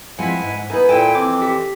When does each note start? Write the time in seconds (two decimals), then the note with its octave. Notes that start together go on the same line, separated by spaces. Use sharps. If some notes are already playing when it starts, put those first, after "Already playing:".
0.19 F3 G#3 C4 E4 F#5 G#5 B6
0.42 G#2
0.70 B3 D#4 E4 A#4 B4 G#5
0.89 A#2 E4 A4 G5 G#5
1.15 F2 E3 C4 D6
1.42 G4 B6